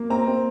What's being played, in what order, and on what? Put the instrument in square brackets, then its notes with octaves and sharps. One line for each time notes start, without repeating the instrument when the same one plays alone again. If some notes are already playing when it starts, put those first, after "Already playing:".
Already playing: [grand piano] A#3
C4 A#5
C4